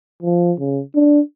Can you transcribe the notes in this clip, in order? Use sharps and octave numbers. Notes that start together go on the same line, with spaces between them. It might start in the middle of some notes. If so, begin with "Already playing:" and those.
F3
C#3
D4